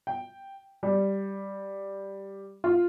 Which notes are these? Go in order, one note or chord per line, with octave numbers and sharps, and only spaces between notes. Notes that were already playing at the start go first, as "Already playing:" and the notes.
G5
G3
F4